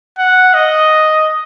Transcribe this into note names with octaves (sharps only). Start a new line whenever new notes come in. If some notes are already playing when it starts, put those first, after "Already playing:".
F#5
D#5